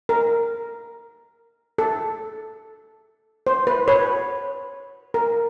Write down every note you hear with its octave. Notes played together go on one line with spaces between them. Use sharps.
A#4
A4
C5
B4
B4 C#5
A#4